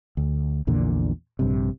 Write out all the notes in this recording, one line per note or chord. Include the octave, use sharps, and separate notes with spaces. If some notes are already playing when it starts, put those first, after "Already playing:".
D2
A#1 E2 A#2 D3
A#1 G2 C3